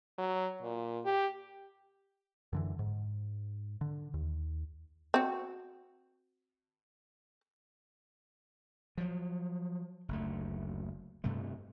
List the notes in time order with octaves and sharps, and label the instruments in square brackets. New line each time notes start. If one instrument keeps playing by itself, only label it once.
[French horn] F#3
A#2
G4
[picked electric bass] F#2 D3 E3
G#2
D3
D#2
[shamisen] C4 F#4
[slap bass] F3 F#3
F#1 D2 A3
G2 C3 G3 A3